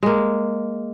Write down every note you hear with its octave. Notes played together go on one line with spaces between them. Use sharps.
G#3 A#3